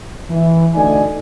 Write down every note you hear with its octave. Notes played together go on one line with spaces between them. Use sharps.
E3
D2 D3 A3 D#4 D5 G#5